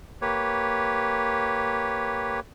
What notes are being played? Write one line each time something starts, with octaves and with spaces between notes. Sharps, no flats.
A#3 G4 B4 C#5